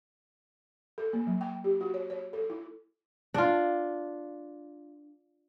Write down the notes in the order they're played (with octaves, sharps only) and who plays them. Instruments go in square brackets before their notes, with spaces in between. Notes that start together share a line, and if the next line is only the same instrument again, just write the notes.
[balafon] A4
A#3
F#3
G5
G4
F#4
C#5
C#5
A4
E4
[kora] D4 F4